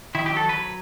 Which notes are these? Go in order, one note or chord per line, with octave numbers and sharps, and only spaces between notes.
D#3 E4
G4
F#3
A4
F#3 B4